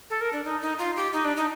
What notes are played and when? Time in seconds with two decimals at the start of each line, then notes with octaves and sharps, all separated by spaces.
0.10 A4
0.21 A#4
0.33 D4
0.45 D#4
0.62 D#4
0.79 F4
0.96 G4
1.13 D#4
1.25 D4
1.37 D#4